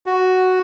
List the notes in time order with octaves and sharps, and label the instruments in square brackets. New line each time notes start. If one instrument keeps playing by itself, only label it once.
[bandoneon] F#4